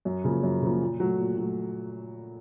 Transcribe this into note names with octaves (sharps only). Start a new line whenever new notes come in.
F#2
C#3 F3 A#3
F#2
C#3 F3 A#3
A#2
F#3 A3
A#2
F#3 A3